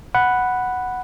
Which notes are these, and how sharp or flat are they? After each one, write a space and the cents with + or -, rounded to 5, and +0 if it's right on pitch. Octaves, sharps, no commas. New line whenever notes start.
F#5 +0 B5 +0